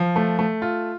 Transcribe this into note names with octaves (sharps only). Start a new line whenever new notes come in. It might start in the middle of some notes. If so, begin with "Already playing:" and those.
Already playing: F3
A3
A3
F4